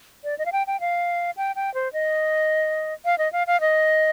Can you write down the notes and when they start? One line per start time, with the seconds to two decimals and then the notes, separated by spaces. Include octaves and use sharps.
0.24 D5
0.38 D#5
0.46 F5
0.52 G5
0.67 G5
0.80 F5
1.37 G5
1.56 G5
1.74 C5
1.93 D#5
3.05 F5
3.18 D#5
3.33 F5
3.47 F5
3.61 D#5